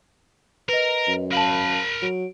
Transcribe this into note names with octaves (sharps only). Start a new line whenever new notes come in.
A#4 B4 D#5
F#2
A#4 F5 A5 B5
F#3 D7